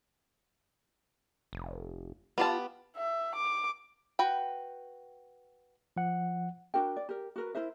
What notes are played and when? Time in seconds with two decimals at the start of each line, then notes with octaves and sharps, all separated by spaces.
1.53 F1
2.38 B3 F4 G4 A5
2.96 E5
3.36 D6
4.19 F#4 B4 G5
5.96 F3 F#5
6.74 D4 F#4 A#4 G5
6.97 D5
7.09 G4 A#4
7.36 F#4 A#4 B4
7.55 E4 A#4 C5 E5